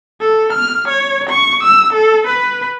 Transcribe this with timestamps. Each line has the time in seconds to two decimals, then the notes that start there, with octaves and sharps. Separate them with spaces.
0.21 A4
0.53 F6
0.88 C#5
1.30 C#6
1.63 E6
1.93 A4
2.27 B4